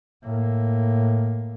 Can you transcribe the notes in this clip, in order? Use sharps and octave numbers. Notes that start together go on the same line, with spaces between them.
A2 A#3